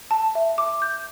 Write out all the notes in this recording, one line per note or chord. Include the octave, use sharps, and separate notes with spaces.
A5
E5
D6
G6